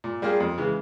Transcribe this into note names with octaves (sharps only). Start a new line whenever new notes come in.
A#2
G3 A#3 F4 G#4
F2
C#3 E3 G#3